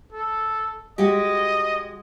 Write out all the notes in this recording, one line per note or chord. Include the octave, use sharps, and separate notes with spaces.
A4
G#3 F#4 G4 D#5